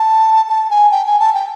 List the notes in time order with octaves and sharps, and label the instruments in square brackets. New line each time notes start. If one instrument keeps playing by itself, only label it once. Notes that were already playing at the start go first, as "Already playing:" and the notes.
Already playing: [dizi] A5
A5
G#5
G5
G#5
A5
G5